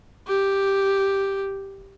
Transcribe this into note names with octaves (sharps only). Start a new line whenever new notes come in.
G4